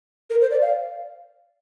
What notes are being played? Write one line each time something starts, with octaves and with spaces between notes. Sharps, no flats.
A#4
C5
D5
F5